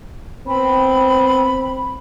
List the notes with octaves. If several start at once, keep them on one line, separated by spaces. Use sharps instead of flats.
B3 C4 B5